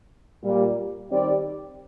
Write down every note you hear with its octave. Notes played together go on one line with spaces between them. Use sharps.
A#2 G3 A#3
D#3 G3 C4 G4 D5